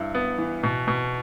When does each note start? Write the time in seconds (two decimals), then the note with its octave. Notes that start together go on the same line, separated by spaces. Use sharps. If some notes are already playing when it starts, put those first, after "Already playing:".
Already playing: G2 E4
0.15 B3
0.38 E3
0.63 B2
0.88 B2